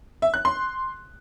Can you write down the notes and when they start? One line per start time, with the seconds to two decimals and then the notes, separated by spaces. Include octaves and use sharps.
0.22 E5
0.34 F#6
0.45 C6